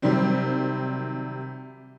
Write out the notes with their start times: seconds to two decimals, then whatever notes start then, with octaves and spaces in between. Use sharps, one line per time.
0.02 C3 D#3 F#3 G3 C4